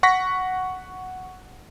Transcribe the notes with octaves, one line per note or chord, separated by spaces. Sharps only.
F#5 C#6 A#6 B6